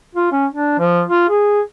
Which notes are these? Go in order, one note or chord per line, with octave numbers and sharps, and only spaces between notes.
F4
C#4
D4
F3
F4
G#4